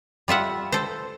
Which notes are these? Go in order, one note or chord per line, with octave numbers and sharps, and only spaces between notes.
G3 F4 E5 F#5
A4 C5